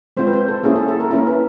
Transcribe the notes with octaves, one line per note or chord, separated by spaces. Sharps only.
G#3 C4 F4 C5
B4
C5
A4
A#3 C#4 E4 G#4
A4
A4
A#4
A#3 C#4 E4 A#4
B4